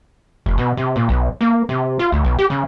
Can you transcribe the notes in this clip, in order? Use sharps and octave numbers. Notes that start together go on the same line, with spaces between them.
F1
B2
C3
A#2
B1
A#3
C3
F4
D2
B1
G4
C#3